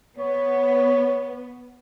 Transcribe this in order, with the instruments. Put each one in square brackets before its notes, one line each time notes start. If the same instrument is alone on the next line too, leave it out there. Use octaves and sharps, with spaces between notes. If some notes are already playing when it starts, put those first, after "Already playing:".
[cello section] B3 [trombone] C#5